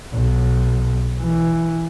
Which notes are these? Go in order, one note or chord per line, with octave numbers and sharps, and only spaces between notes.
B1
E3